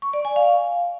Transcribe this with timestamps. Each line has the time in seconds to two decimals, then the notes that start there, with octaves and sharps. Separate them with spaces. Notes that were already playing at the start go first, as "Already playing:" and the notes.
0.02 C#6
0.13 D5
0.25 G#5
0.36 F5